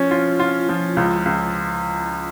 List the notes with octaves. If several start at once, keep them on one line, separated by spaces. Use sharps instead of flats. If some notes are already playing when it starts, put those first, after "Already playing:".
Already playing: F3 C#4
F4
F4
F3
C#2
C#2